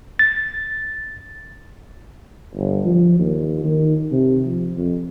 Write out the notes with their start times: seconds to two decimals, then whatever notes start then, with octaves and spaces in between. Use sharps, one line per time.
0.19 A6
2.55 G1
2.85 F3
3.19 D#2
3.64 D#3
4.12 C3
4.46 F3
4.77 F2